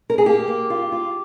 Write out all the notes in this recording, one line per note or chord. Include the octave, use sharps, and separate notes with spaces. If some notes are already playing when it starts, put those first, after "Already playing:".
A#4
G#4
A#3 G4
A#3
F4
F4